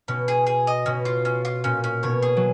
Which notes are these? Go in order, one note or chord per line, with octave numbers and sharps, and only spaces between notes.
B2 C#4
G#4
G#4
D#5
B2 C#4
F4
C#4
F4
A#2 C#4
C#4
B2 C#5
G#4
F#3